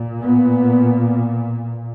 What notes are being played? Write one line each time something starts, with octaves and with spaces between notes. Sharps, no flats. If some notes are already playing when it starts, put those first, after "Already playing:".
Already playing: A#2
B3